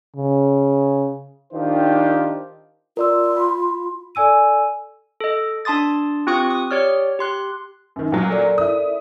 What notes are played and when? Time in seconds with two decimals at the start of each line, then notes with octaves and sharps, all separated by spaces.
0.16 C#3
1.53 D#3 D4 D#4 F4 G4 C5
2.97 F4 A#4 D5 E6
3.37 B5
4.15 A4 D5 G#5 E6 D#7
5.20 A4 D#5
5.65 D4 A5 C6 D#6 A6
6.27 C4 F4 G4 C#6 D#6 F#6
6.50 D#6
6.71 G4 C#5 D5 F6
7.19 G4 C6 F#6
7.96 F#2 D#3
8.12 A#2 F#3
8.31 A4 A#4 D5
8.58 E4 D#6